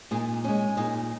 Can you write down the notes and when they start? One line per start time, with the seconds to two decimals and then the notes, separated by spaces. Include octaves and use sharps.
0.11 A#2 D#4 G#4
0.44 G#3 C#4
0.77 A#2 D#4 G#4